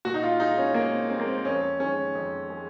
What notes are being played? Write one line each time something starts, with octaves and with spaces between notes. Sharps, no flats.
A#2 F#4
D#4
F4
G#3 D#4
C#4
A#2 A#3
C4
G#3 C4
A#3
C4
F2 C#4
D#3 G#3 C#4
F2
G#3